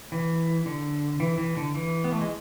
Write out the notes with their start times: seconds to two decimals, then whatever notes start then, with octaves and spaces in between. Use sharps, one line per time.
0.12 E3
0.66 D3
1.20 E3
1.38 E3
1.57 D3
1.75 E3
2.04 B3
2.12 A3
2.21 G#3